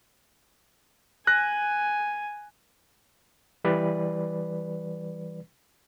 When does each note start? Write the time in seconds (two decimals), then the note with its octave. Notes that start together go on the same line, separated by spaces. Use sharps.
1.27 G#5 F#6 A#6
3.64 E3 G3 B4 D5